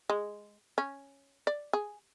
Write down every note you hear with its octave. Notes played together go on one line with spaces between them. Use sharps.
G#3
C#4
D5
G#4